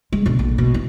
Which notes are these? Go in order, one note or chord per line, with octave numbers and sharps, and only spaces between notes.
G#3
B2 D3
A#1
B2
E4